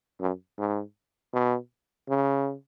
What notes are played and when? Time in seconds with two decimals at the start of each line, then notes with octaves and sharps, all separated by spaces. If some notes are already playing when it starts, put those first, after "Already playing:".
0.20 F#2
0.58 G#2
1.34 B2
2.09 C#3